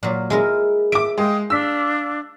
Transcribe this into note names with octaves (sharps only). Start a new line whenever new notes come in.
A#2 F#3
G#3 E4 A#4
E5 D6 D7
G#3 F5 G5 D#6
D4 F5 E6 B6